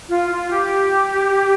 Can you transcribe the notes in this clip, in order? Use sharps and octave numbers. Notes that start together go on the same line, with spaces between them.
F4
F4
G4